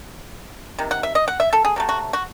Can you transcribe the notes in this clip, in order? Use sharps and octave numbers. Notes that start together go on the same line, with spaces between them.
C3 D#3
F#5
E5
D#5
F#5
E5
A4
G#4
C3 F#3 A3
F#4
F#4